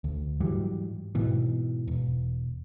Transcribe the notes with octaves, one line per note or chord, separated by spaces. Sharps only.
D2
G#2 E3 F#3 G3
G#2 B2 E3
E1